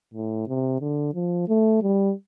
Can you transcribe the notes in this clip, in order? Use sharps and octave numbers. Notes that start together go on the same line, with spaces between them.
A2
C3
D3
F3
A3
G3